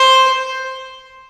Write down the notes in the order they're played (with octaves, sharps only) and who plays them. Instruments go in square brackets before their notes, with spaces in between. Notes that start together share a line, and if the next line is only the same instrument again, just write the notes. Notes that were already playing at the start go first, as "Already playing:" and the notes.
Already playing: [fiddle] C5